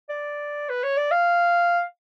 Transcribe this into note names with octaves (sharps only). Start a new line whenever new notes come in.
D5
B4
C#5
D5
F5